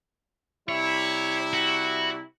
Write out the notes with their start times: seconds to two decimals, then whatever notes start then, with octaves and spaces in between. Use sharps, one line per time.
0.69 C3 G3 E4 C#5
1.53 F#4